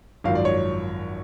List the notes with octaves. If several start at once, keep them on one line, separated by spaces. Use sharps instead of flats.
G#1 F#2 F3 F5
D5
C#5